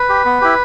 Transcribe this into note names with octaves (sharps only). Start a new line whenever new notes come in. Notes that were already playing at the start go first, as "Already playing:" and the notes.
Already playing: B4
G4
B3
E4 G4